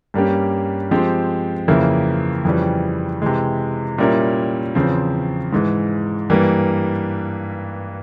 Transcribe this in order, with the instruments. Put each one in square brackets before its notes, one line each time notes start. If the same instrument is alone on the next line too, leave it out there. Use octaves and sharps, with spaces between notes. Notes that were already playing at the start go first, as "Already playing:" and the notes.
[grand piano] G2 G3 A#3 C#4 G4
F3 G#3 C4 G4
F2 C#3 E3 A#3 E4
F2 C#3 E3 G3
C3 E3 G#3
A#2 G3 C#4 E4 A#4
E2 C#3 F3 C4
G#2 E3 G#3
G2 E3 G3 A#3